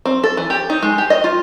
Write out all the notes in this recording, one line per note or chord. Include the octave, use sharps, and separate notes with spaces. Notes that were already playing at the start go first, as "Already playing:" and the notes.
C4
A4
E3
G4
D#4
G#3
G4
D#5
F4